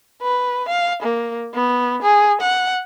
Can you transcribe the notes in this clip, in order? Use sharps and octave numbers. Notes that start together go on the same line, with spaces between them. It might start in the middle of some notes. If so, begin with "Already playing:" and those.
B4
F5
A#3
B3
G#4
F#5